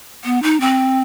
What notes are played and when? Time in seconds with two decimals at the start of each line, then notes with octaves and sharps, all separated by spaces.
0.25 B3
0.43 D#4
0.61 C4